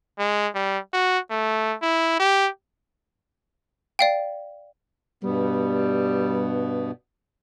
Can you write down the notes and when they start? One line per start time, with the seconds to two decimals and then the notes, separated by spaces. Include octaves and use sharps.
0.19 G#3
0.55 G3
0.93 F#4
1.31 A3
1.82 E4
2.20 G4
3.99 D5 F5 G5
5.23 G2 B2 G3 B3